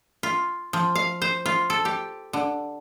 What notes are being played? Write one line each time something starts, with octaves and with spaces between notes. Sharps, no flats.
F4
F3
F5
C5
F4
A4
G4
D3